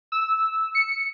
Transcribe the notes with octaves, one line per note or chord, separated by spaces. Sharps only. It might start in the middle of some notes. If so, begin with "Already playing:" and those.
E6
C#7